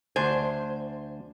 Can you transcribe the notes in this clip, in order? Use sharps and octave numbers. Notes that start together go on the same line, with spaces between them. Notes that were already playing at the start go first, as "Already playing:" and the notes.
D2 D4 C5 G#5